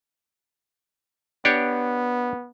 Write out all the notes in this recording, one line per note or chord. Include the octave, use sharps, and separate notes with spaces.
B3 D4 G4 C#5